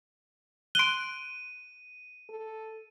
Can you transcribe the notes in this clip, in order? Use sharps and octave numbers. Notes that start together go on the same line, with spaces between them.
C6 F#6 D7 D#7 G7
A4